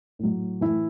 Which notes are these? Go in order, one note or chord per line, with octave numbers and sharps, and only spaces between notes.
A2 F#3
A2 E3 E4